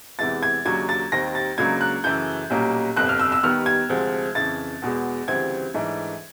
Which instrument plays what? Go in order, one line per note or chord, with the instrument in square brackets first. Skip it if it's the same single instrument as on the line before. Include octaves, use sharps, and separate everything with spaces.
[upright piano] E2 C3 E3 G#3 A6
G#6
D#2 C#3 F#3 A#3 D4 G#6
A6
D#2 D#3 G3 C4 A#6
A6
C#2 C#3 F#3 A#3 D4 G#6
F#6
F#2 C#3 E3 A3 G6
B1 A#2 G3 A#3 C#4
G1 F2 C3 F#6
F6
E6
E6
D#2 D#3 G3 B3 F6
G#6
D2 C3 F3 G#3
F2 C#3 E3 A6
E2 B2 G#3
D2 C#3 E3 G3 C4 G#6
G#2 E3 A3 D4